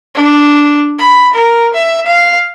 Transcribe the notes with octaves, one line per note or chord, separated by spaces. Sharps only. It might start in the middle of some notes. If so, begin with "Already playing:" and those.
D4
B5
A#4
E5
F5